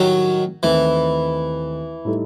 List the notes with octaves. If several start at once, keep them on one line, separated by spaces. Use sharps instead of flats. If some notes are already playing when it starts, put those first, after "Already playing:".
Already playing: A2 D#3 F#3 G3 D#4 G4
D#2 D#3 E3 A3 C4
A2 G3 D#4 A4